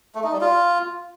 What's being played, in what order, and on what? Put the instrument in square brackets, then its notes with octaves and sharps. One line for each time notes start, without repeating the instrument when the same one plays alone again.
[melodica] A3
D#4
G3
F4